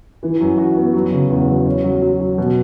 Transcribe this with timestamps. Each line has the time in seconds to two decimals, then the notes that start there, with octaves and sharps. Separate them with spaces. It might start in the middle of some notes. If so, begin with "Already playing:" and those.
0.23 E3
0.40 F#2
0.58 F#4
0.76 B3
0.94 F#3
1.12 C#3
1.30 E2
1.49 F#3
1.66 C#4
1.84 F#3
2.02 F#3
2.20 F#3
2.38 B2